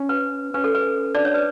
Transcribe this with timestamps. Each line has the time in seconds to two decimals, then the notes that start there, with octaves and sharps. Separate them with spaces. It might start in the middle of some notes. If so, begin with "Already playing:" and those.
Already playing: C#4
0.09 B4
0.54 C#4 B4
0.64 A4
0.75 B4
1.15 D4 D5
1.25 C#5
1.34 B4